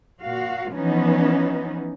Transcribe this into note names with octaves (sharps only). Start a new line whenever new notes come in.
A#2 F#4 F5
E3 F3 B3 C#4 D#4